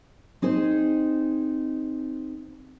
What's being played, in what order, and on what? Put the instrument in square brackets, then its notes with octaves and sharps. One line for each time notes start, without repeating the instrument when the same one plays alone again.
[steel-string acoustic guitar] C4 D#4 G#4 C5